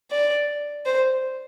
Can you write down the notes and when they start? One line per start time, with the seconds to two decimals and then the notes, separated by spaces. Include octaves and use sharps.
0.11 D5
0.86 C5